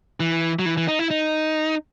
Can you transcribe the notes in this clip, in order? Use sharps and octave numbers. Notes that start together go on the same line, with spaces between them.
E3
F#3
E3
E3
D#4
E4
D#4